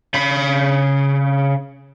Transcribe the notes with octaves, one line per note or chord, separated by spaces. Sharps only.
C#3 B5